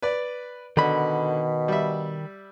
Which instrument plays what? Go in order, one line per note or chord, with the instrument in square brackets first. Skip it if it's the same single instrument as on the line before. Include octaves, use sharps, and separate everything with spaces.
[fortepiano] B4 D5
[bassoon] B2 [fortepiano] D3 [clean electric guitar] D#3 B5
[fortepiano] G3 E5